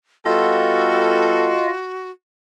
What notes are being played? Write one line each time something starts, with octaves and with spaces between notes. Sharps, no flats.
G3 B3 F4 F#4 A4 D#5